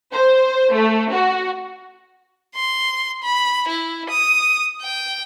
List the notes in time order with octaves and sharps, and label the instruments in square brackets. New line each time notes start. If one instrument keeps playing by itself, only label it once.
[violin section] C5
A3
F#4
[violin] C6
B5
E4
D#6
G5